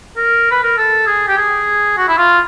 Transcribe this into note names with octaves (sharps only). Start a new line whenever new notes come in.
A#4
B4
A#4
A4
G#4
G4
G#4
F#4
E4
F4